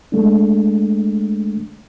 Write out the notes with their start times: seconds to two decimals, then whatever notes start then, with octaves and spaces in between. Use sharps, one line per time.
0.12 G#3 A3 D4